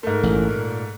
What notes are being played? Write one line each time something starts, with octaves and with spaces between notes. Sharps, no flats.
G#2 A3 A#4
A1 A#2
A#2